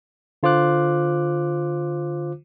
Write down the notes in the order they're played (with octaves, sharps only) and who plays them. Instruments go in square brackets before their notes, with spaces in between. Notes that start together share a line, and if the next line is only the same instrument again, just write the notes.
[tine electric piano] D3 F4 C5 D6 F#6